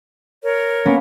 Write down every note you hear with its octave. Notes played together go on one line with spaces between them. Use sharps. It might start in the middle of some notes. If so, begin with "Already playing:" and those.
A#4 C#5
A#3 B3 C#4